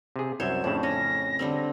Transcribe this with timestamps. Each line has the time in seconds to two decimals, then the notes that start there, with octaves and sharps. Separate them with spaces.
0.16 C3 G#4
0.40 C2 F#2 C5 C#5 E5 E7
0.64 F2 A2 C#3 D4
0.83 C#4 A#6
1.39 D3 G3 C4